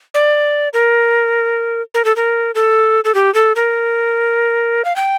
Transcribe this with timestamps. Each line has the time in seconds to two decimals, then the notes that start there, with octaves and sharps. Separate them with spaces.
0.14 D5
0.73 A#4
1.94 A#4
2.05 A4
2.16 A#4
2.55 A4
3.05 A4
3.14 G4
3.34 A4
3.56 A#4
4.85 F5
4.96 G5